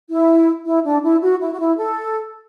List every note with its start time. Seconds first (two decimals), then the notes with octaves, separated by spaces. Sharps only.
0.10 E4
0.65 E4
0.84 D4
1.03 E4
1.22 F#4
1.40 E4
1.52 F#4
1.58 E4
1.78 A4